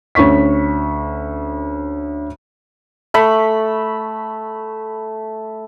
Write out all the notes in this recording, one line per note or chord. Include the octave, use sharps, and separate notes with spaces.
D2 C#4 C#6 B6
A3 B5